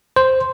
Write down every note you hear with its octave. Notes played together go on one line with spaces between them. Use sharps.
C5